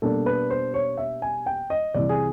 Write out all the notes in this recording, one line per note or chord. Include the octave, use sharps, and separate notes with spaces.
B2 G3 A#3 D4 A4
B4
C5
C#5
E5
G#5
G5
D#5
C2 C3 E3 D5
G#4